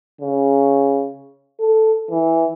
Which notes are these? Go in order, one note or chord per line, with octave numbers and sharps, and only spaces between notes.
C#3
A4
E3